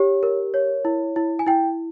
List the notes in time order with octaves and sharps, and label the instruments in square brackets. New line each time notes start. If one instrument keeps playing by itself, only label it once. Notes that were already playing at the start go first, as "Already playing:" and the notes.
Already playing: [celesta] G4 C#5
A#4
C#5
E4
E4
G#5
E4 G5